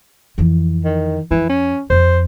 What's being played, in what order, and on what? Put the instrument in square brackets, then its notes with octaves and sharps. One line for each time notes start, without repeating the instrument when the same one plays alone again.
[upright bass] F2 E3
[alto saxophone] D#3
[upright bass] F2 [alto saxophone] E3
[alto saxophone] C#4
[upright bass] F2 [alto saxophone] C5